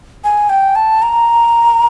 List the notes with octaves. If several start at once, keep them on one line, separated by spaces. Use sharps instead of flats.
G#5
G5
A5
A#5